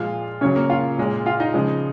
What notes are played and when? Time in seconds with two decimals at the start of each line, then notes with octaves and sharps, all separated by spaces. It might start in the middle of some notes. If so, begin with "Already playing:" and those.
Already playing: A#2 F3 G#3 F4 F5
0.41 C#3 F#3 C#4 C#5
0.56 A#3 A#4
0.70 F4 F5
0.98 A#2 G#3
1.26 F4 F5
1.40 D#4 D#5
1.54 C#3 F3 G#3